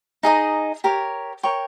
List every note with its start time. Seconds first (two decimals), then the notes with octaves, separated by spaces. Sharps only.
0.23 D#4 G#4 D#5 A#5
0.84 G4 A#4 C#5
1.43 A#4 C#5 G5 C#6